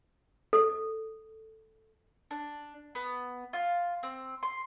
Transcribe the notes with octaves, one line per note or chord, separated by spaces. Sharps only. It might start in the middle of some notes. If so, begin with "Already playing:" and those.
A4
D4
B3
F4
C4
C6